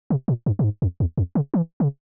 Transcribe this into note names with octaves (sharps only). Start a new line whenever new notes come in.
C3
A#2
G2
A#2
G#2
F2
E2
F2
C#3
E3
C#3